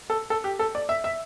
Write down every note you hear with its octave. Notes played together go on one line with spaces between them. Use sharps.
A4
A4
G4
A4
D5
E5
E5